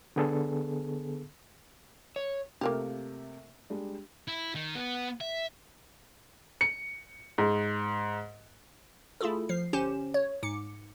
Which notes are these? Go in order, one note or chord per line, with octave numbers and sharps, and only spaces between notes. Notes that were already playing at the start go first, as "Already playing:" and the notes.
D3 B3 G#4 A4
C#5
C3 A3 A#3 F4 G4 A#4
G3 G#3 D4
E4
D#3
B3
E5
C#7
G#2
A3 E4 F4 G#4 A4
F3 C7
G1 C#4 G4 C5 E7
C#5
G#2 D6 C#7